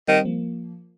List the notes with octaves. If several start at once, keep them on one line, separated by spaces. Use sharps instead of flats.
D#3 G3 C4
F3 A#3